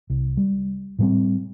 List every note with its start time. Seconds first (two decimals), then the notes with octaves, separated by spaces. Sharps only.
0.10 C2
0.37 G3
0.99 A2 G3 C4